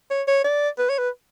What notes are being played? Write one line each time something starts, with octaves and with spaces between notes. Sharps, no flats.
C#5
C#5
D5
B4
C#5
B4